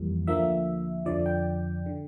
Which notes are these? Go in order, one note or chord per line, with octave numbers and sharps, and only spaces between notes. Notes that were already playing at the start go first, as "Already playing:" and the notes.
Already playing: F2 E3 G3 A#3
D2 D3 F3 A#3 E5
F2 D3 F3 D5
G5
D3